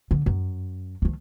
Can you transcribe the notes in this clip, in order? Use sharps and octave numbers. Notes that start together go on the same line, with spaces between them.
D3
F#2
D#3 F3